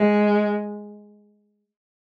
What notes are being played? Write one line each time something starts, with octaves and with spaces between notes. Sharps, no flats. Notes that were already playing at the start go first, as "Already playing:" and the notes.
Already playing: G#3